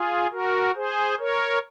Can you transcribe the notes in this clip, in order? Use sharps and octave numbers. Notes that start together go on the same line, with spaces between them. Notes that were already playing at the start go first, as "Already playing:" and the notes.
Already playing: F4 G#4
F#4 A#4
G#4 C5
A#4 C#5